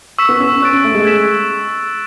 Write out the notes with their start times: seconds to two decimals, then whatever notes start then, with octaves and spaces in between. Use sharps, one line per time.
0.18 C#6 E6 B6 E7
0.29 B3
0.40 C#4
0.62 C#4 C#6 F#6 A6 D7
0.73 C#4
0.84 A3
0.94 G#3
1.05 G#6 B6 E7